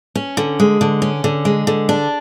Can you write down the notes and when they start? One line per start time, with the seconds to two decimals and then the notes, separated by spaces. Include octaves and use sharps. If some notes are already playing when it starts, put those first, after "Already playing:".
0.15 C#4
0.37 D3
0.60 G#3
0.81 D3
1.02 C#4
1.24 D3
1.45 G#3
1.67 D3
1.89 D4